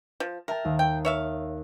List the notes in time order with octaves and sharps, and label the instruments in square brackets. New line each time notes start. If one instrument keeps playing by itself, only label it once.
[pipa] F3
[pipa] A#4 [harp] E5 G5 A5
[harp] D#2
[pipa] G5
C#5 E5 F5